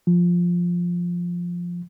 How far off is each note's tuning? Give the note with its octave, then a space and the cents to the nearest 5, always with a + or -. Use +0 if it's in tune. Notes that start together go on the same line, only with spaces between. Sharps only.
F3 +5